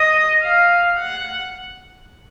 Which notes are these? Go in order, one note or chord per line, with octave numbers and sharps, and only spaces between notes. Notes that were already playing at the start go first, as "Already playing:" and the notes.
Already playing: D#5
F5
F#5